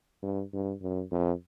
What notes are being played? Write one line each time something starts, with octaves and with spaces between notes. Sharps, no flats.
G2
G2
F#2
F2